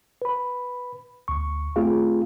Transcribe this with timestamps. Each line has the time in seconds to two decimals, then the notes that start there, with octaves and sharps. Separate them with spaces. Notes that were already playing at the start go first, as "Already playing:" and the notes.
0.22 B4 B5
1.28 D2 C#6
1.76 A3 C4 F4 G#4 F5